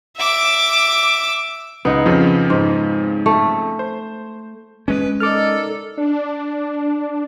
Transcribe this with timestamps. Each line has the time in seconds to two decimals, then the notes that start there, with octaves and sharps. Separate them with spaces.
0.17 E5 D6
1.85 C#2 B3 D#4
2.06 F2 C#3 F3
2.50 G#2
3.26 A3
3.79 C5
4.88 G#3 C#4 B4
5.20 D#4 A4 A#4 D5 D6 F6
5.97 D4